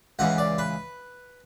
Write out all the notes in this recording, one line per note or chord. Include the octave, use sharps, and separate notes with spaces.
C#2 C#3 E3 F#5
D5
B4